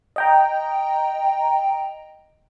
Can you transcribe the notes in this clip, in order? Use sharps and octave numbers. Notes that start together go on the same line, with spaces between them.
D#5 G5 A#5